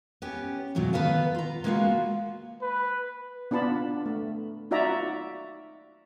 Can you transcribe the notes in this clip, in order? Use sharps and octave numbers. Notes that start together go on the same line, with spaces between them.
B3 C#4 G4
F2 G#2 B2 F#3 A3
D#3 B3 B4 F5 A5
F4 A#5
G#3 A#3 B3 D#4 F4 F#4
B4
B3 D4 F4 A5 B5
A3
D#4 F4 F#4 D5 E5 A#5